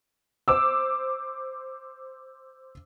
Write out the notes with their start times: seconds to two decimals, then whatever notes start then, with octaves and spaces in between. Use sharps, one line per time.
0.48 C5 D6 E6